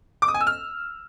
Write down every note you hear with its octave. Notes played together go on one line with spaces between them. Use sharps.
D6
D#6
G#5
E6
F6